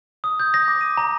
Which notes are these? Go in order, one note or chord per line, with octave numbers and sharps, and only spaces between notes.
D#6
G6
A#6
D6
D#7
A#5